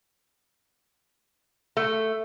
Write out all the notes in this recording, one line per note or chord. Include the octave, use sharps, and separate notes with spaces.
A3